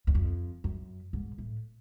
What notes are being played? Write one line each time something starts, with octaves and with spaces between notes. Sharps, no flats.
E2
F2
F#2
G#2
A2